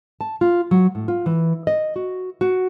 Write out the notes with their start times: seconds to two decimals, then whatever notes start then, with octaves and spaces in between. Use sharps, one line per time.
0.21 A5
0.41 F4
0.71 F#3
0.95 A2
1.08 F4
1.26 E3
1.67 D#5
1.96 F#4
2.41 F#4